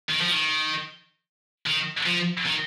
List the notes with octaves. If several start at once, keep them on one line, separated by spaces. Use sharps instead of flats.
D#3
F3
D#3
D#3
F3
D#3